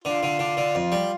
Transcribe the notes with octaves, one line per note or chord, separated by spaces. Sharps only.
D3 F4
D3
D3
D3
F2
G3